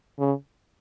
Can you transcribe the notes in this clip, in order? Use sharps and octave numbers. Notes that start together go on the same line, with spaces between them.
C#3